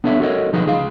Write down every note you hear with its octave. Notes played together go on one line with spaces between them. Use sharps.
B3 D4 A4 C#5 E5
F#4 A4 A#4 C5 C#5 D#5
B1 F3 D#4 G#4 B4 D#5
C#2 G#4 F5